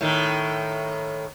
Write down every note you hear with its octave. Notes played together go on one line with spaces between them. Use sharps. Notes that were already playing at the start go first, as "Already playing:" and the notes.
A2 D#3